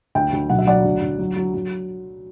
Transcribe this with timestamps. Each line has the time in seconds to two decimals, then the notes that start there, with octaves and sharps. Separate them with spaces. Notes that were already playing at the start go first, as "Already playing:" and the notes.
0.15 D2 E5 G5
0.33 D2
0.50 B1 F#5
0.58 E5
0.67 F#3 D5 F#5
0.84 D2
1.01 D2
1.19 F#3
1.36 F#3
1.54 F#3